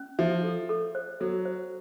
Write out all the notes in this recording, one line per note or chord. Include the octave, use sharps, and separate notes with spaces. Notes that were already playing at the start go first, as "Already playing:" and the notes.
Already playing: C#4
F3 E5
A4
A4
C5
F#3 A4
C5